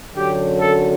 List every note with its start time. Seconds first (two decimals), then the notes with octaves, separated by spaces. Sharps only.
0.16 F#2 D3 F#3 G4
0.60 A4